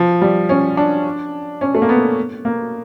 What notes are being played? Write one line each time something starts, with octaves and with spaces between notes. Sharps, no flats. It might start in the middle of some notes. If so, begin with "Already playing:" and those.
Already playing: F3
G3
C#4
D4
C#4
A3
A#3
B3
A#3